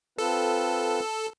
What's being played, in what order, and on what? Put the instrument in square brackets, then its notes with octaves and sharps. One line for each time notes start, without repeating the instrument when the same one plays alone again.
[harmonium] C4 F4 B4 [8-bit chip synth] A4